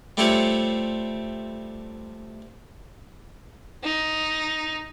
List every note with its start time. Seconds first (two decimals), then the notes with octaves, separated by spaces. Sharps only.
0.17 G3 A3 C4 F4 G4 C#5
3.84 D#4